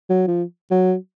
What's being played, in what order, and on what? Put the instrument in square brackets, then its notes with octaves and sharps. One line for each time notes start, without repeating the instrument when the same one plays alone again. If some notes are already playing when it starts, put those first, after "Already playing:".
[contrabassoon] F#3
F3
F#3